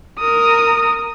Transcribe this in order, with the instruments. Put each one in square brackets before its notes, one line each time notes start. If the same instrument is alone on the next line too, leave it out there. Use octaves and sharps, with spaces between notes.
[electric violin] A#4 D#6